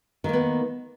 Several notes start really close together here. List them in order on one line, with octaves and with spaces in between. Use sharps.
D#3 A#3 B3